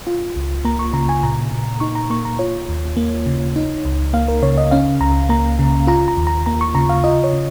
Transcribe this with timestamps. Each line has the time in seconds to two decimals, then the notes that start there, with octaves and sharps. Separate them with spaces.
0.07 F4
0.36 C#2
0.65 A#3 A#5
0.79 C#6
0.93 C#3 A#5
1.09 G#5
1.23 A#2 A#5
1.51 A#2
1.80 D#4 C#6
1.95 A#5
2.10 A#3 C#6
2.25 A#5
2.39 F4 C#5
2.69 D#2
2.97 A#3
3.26 C#3
3.56 D#4
3.85 C#2
4.13 A#3 F5
4.28 A#4
4.42 C#3 C#5
4.58 D#5
4.71 C#4 F5
5.01 C#2 A#5
5.29 A#3 A#5
5.59 C#3
5.87 F4 A#5
6.08 A#5
6.17 D#2
6.27 A#5
6.46 A#3 A#5
6.61 C#6
6.75 C#3 A#5
6.89 F5
7.04 F4 D#5
7.24 C#5
7.33 C#3